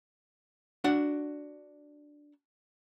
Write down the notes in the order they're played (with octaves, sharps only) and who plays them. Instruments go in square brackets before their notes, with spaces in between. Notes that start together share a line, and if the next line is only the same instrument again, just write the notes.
[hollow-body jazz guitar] D4 F#4 F#5